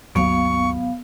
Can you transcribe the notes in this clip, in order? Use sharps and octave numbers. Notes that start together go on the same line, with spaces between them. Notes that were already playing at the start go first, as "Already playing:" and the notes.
G#1 D#2 F#3 B3 F5 C#6